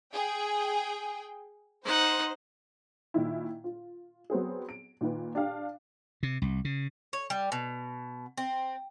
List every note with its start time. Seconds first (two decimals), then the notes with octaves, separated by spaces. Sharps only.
0.13 G#4 G5
1.84 D#4 C5 F#5
3.14 A#2 D#3 E4
3.64 F4
4.30 F#3 B3 C4 G#4
4.69 D7
5.01 A#2 D#3 B4
5.35 D4 G4 F5
6.23 C3
6.42 C2
6.65 C#3
7.13 C#5
7.30 G3
7.52 B2
8.37 C4